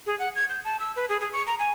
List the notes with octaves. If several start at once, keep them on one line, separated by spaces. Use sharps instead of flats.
G#4
F#5
G#6
G6
A5
E6
B4
G#4
G#4
C#6
A#5
G#5